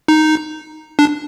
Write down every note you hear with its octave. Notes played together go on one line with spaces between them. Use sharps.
D#4
D4